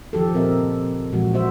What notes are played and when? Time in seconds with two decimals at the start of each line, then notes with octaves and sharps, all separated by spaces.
0.13 D#3 F3 G4 A4
0.33 A#2 C#3 C4 A#4 D#5 E5
1.13 A#2 E3 F3 G#3 F#4
1.34 F#4 C5 E5